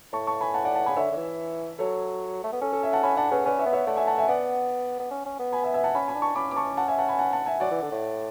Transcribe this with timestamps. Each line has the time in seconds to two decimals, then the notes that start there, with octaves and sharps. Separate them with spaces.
0.13 A2 A5 C#6
0.27 A5 C#6
0.41 G#5 B5
0.54 F#5 A5
0.65 D5 F#5
0.75 F#5 A5
0.86 C#3 G#5 B5
0.96 D3 C#5 E5
1.12 D3
1.17 E3
1.79 F#3 A4 C#5
2.44 A3
2.52 B3
2.62 C#4 A4
2.73 A4
2.83 E5 G#5
2.93 F#5 A5
3.03 C#4 G#5 B5
3.17 D4 F#5 A5
3.31 C#4 G#4 B4
3.46 C#4 B4 D5
3.59 C#5 E5
3.66 B3
3.73 C#5 E5
3.87 A3 D5 F#5
3.97 E5 G#5
4.07 F#5 A5
4.18 E5 G#5
4.28 B3 D5 F#5
5.00 B3
5.11 C#4
5.26 C#4
5.39 B3
5.52 G#5 B5
5.63 E5 G#5
5.74 E5 G#5
5.84 F#5 A5
5.94 C#4 G#5 B5
6.08 G#5 B5
6.15 D4
6.22 A5 C#6
6.36 C#4 B5 D6
6.51 D6
6.56 A5 C#6
6.77 F#5 A5
6.88 E5 G#5
6.98 F#5 A5
7.08 G#5 B5
7.19 F#5 A5
7.33 F#5 A5
7.46 E5 G#5
7.60 F#3 D5 F#5
7.71 E3
7.82 D3
7.92 A2